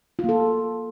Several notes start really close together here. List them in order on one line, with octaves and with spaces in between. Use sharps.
F4 A#3 A4